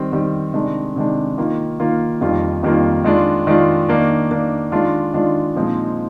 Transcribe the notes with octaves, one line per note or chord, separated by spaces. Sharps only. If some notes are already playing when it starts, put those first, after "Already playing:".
Already playing: D#3 G3 C4
D#3 G3 C4
C3 D#3 G#3 D4
C3 D#3 G#3 D4
D#3 A#3 F4
D#3 A#3 F4
F2 D#3 G3 A#3 F4
F2 D#3 G3 A#3 F4
D#3 G#3 D4 F4
D#3 G#3 D4 F4
D#3 A#3 D4
D#3 A#3 D4
D#3 G#3 D4 F4
D#3 G#3 D4 F4
A#2 F3 G#3 C4 D#4